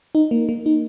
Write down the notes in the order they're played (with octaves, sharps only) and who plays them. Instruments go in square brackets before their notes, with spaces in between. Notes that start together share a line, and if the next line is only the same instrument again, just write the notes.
[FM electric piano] D#4
A#3
A#3
D#4